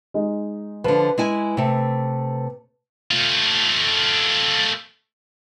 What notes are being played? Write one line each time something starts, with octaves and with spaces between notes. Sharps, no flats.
G#3 D#4
D3 F3 B4
G#3 E4 G#5
C3 A3
A3 F4